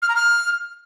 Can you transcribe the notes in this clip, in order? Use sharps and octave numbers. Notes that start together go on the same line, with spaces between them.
F6
A#5
F6